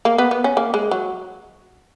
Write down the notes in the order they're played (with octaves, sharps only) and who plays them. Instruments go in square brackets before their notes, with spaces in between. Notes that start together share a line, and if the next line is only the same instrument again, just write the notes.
[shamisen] A#3
B3
B3
C#4
A#3
G#3
F#3